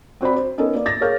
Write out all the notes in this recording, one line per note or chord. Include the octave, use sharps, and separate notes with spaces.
C4 F#4 C5 D5 B5
C5
B3 C#4 D#4 A4 A#4 C#5
A#3 D5
D6 A6 A#6
G#4 A#4 C#5 F5 F6 G6